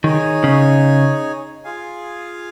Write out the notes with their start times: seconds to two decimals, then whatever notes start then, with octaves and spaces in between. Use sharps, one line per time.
0.03 D#3 D#4 G#4 C#5 G#5
0.44 C#3
1.64 F4 G#4 F5 G#5